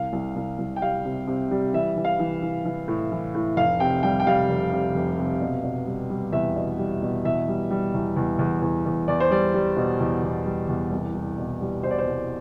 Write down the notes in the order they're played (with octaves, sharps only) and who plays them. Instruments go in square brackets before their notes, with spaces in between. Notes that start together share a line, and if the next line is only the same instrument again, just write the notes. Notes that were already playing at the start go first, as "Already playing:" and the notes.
Already playing: [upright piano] C2 F5
C2
C2
C2
G5
G3 F5
C3
C3
G3
E3 E5
E3
F5
E3
E3
E3
A2
E3
A2
F1 F5
C3 G5
G3 G5
G5
G3 F5
F1
C3
F1
C3
B2
B2
G3
G3
E2 E5
B2
G3
B2
E2 E5
G3
G3
E2
E2
E2
E2
E2
E2 D5
C5
G3 D5
G3
B2
E2
E2
G3
E2
C2
C2
B2
G3
B2 C5
D5
C5
C2